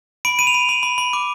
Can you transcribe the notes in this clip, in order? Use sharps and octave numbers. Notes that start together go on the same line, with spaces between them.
B5 D7
B5 D#7
F7
B5
B5
B5
B5
D6